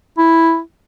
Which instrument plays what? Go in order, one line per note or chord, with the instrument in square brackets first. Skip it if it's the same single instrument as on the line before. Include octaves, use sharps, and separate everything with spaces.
[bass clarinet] E4